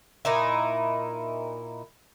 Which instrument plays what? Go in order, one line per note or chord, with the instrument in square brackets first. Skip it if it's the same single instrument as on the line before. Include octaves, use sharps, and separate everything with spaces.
[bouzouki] A#2 D#4 E4